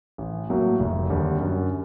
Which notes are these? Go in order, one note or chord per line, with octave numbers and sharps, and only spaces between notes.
A1
A2 F#3 A#3
F1
D#2 D3 G3
F#2